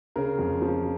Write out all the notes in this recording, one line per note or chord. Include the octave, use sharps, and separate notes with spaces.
C#3 A#4
F2
F3